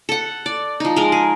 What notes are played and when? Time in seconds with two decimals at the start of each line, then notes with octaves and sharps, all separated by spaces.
0.09 A4 F#5
0.46 D5
0.80 F3 D#4
0.96 G#3 A#4
1.12 G#4